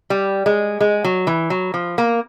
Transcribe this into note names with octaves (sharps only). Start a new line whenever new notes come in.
G3
G#3
G#3
F#3
E3
F#3
F3
A#3